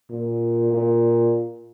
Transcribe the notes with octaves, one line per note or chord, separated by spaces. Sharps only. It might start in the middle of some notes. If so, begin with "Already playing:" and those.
A#2
A#2